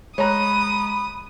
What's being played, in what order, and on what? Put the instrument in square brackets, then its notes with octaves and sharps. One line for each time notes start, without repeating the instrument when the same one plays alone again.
[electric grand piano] G#3 [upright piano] C#5 A#5 F#6 [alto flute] B5 [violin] D#6